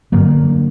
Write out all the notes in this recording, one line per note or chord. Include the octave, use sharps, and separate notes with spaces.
G2 D3 F#3 A#3